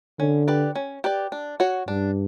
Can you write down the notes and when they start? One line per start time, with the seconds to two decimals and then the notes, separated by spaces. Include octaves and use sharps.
0.19 D3 C#4
0.48 G4 B4 D5
0.75 C#4
1.04 G4 B4 D5
1.32 D4
1.60 F#4 C#5
1.88 G2 D4